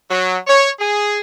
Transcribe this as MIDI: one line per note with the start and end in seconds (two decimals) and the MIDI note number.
0.10 0.36 54
0.46 0.69 73
0.79 1.20 68